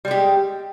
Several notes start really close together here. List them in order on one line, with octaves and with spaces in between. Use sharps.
G3 G#3 G4